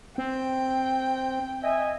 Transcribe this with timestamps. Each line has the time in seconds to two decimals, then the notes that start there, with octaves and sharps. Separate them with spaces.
0.18 C4 G5
1.63 D#5 E5 G#5